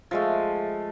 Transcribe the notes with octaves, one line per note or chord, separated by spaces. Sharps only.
F3 G#3 A3